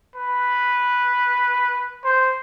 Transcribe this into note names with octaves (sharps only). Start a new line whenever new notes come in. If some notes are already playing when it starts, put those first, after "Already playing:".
B4
C5